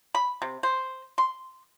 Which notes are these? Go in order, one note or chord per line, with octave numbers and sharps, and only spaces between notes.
B5
C3
C5
C6